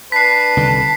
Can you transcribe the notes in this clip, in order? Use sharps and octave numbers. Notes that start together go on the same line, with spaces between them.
D4 B4 A5 B6 C7
C2 D3 D#3